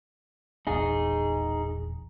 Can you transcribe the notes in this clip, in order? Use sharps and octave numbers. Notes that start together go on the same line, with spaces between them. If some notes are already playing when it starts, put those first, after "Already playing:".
E1 A#1 E2 D#4 G#4